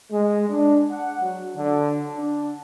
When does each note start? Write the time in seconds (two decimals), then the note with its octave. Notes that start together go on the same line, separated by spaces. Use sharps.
0.11 G#3
0.49 D4
0.91 F#5
1.21 F#3
1.56 D3
2.16 D4